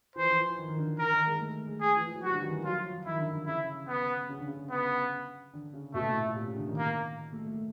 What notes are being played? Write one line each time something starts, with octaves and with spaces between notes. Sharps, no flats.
E3 C5
F3
E3
D#3
D#3
D3
D#3 A#4
D#3
G#3
A3
G#3
G#4
E3
F3
F#3
G3 F#4
D3
D#3
E3
F3
F#3 F4
F3
F3
D#3 E4
D3
D3
C#3 E4
B3
C#3
D3
C#3
B3
D3
C#3
B2 A3
A2
A#2
C3
C#3
D3
D#3
A#3
A3
A3